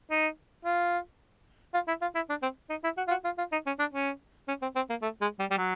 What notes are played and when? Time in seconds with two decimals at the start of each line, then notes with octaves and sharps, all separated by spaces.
0.11 D#4
0.65 F4
1.74 F4
1.88 E4
2.01 F4
2.15 E4
2.29 D4
2.42 C4
2.70 D#4
2.84 E4
2.97 F#4
3.08 F4
3.11 F#4
3.24 F4
3.38 F4
3.52 D#4
3.66 C#4
3.79 D4
3.93 C#4
4.48 C#4
4.62 C4
4.75 C4
4.89 A#3
5.02 A3
5.21 G#3
5.39 G3
5.50 G3
5.58 F#3